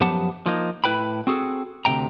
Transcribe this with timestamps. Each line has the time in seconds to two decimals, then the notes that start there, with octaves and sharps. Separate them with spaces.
0.01 F#2 F3 B3 G4 F#5 A5
0.46 F3 A#3 D#4
0.84 A2 E4 B4 G5 B5
1.27 C4 F#4 G#4 A4
1.85 D2 G2 C3 G5 A#5